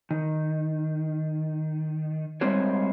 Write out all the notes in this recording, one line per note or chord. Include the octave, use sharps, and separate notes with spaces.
D#3
G3 G#3 C4 F#4 C5 C#5